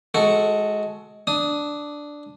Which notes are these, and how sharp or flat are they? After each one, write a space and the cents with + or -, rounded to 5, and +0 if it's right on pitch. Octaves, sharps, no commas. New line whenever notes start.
G#3 +20 F#4 +0 A4 +0
D4 +0 D#6 +15